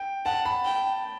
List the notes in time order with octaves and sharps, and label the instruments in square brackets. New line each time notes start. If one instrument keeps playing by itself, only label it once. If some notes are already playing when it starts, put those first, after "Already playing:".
Already playing: [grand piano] G5
[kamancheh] F#5 [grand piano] A5
[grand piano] B5
[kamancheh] G5